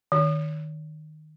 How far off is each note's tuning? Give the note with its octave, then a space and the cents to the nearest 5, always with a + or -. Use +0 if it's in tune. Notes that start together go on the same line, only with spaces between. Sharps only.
D#3 -15